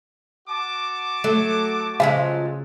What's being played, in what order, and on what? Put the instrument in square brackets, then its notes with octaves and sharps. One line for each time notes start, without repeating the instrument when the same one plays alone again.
[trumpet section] F#4 A5 D6
[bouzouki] F#3 [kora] A3
[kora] C#3 [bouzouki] F3 F#3 G#3 [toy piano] F5